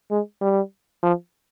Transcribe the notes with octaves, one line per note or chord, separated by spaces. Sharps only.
G#3
G3
F3